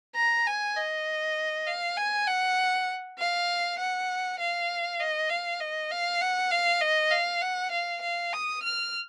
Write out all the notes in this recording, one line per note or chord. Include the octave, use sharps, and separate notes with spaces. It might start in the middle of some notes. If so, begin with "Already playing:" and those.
A#5
G#5
D#5
F5
G#5
F#5
F5
F#5
F5
D#5
F5
D#5
F5
F#5
F5
D#5
F5
F#5
F5
F5
D#6
F6